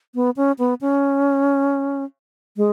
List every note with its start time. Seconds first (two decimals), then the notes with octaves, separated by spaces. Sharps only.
0.15 B3
0.37 C#4
0.59 B3
0.81 C#4
2.57 G#3